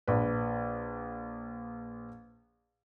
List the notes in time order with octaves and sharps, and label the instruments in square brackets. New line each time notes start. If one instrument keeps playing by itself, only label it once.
[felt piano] A#1 B4